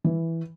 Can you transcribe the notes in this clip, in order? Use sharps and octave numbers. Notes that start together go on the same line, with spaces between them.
E3